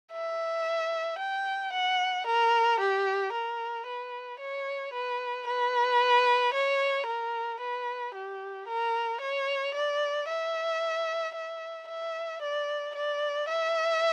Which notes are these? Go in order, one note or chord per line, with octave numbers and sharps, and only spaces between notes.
E5
G5
F#5
A#4
G4
A#4
B4
C#5
B4
B4
C#5
A#4
B4
G4
A#4
C#5
D5
E5
E5
E5
D5
D5
E5